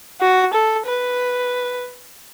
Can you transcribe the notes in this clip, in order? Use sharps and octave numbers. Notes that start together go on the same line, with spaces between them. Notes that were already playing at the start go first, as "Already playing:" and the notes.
F#4
A4
B4